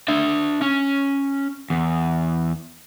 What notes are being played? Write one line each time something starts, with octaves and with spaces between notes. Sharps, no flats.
D4 E5
C#4
E2